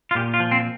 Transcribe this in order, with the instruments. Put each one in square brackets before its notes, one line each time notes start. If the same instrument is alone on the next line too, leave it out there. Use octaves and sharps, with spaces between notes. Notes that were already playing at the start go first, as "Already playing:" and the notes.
[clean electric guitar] F4
A#2 G4
F4
F3
C4